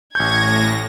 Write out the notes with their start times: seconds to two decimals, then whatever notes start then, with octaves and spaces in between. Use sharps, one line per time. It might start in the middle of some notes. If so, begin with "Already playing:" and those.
0.15 A1 A2 C#6 G6 G#6 A#6